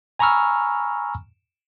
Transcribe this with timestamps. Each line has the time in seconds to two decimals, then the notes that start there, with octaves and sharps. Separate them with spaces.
0.19 G#5 A#5 B5 C#6 E6 F6